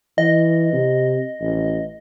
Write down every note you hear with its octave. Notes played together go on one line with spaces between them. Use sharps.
E3 D#5
C3
A1